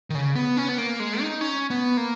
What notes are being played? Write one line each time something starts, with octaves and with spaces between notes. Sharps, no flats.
D#3
C#3
B3
C#4
B3
A#3
G#3
D#4
C#4
B3
A#3